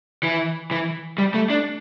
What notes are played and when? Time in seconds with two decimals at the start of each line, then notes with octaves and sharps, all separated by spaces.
0.23 E3
0.71 E3
1.18 G3
1.34 A3
1.50 D4